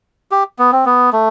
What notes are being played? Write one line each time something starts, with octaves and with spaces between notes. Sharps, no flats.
G4
B3
C4
B3
A3